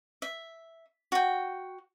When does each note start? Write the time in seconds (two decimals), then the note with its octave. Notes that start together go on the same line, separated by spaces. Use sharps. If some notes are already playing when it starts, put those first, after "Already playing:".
0.22 E5
1.12 F#4 G5